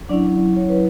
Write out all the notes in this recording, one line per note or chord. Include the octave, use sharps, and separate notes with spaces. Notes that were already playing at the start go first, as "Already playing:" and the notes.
F#3 C#4 D4 E4 D5
C#5
B4